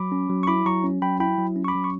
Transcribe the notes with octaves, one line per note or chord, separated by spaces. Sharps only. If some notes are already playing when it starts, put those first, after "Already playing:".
Already playing: F#3 B5 D6
C#4
F#3
C#6
E4 B5 D6
F#3 A#5 C#6
C#4
F#3 G5 B5
E4 G5 B5
F#3
C#4
C#6
B5 D6
F#3
C#6